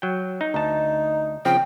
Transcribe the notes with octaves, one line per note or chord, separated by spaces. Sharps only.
F#3 G5
D#4
D2 D#4 A5
C#3 F3 C4 G5